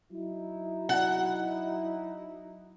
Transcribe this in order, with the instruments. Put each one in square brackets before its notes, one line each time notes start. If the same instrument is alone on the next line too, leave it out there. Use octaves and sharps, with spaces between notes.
[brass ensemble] F#3 D#4 E4
[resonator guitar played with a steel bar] F#5